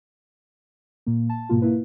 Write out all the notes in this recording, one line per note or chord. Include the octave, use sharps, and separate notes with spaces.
A#2 A#3
A5
G#2 B2 A#3 F4
A#3 E4 B4